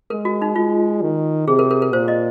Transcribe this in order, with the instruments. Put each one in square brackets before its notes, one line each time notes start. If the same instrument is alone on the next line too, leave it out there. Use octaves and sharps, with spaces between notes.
[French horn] G#3 [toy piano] A#4
[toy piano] F#4
D#4
[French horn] G#3 [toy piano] F4
[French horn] D#3
[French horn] C3 [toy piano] G#4
[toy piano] A#4
A#4
A#4
[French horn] A#2 [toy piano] C5
[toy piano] D#5